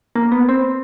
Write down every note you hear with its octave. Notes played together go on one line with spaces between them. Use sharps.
A#3
B3
C4